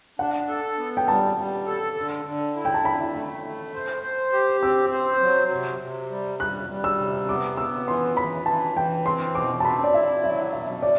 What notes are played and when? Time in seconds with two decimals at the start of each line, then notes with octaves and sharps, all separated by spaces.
0.19 D4 F#5
0.48 A4
0.78 B3
0.97 G5
1.08 G3 A5
1.37 G3
1.66 A4
1.96 D3
2.26 D3
2.56 E4
2.65 G5
2.74 A5
2.85 D3 B5
3.15 A3
3.44 A3
3.74 C5
4.03 C5
4.32 G4
4.63 C4 E6
4.92 C5
5.21 F#3
5.51 C3
5.81 C3
6.10 G3
6.39 G3 F#6
6.69 G3
6.84 E6
6.98 C3
7.28 B3 D6
7.57 B3 E6
7.87 E3 C6
8.17 E3 B5
8.46 E3 A5
8.76 E3 G5
9.06 C4 C6
9.35 B2 D6
9.60 A5
9.64 C4 B5
9.84 D5
9.94 E4 E5
10.24 F#3 E5
10.53 B2 E5
10.83 D5